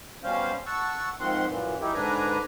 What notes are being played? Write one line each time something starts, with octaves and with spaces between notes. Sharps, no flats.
B2 G3 C#4 C5 F5
F#5 A5 C#6 E6
G#2 D#3 F3 C4 F#5 C6
F#2 A#2 E3
F#2 D#4 E4 G4
G#2 D3 D4 B4 G#5 A#5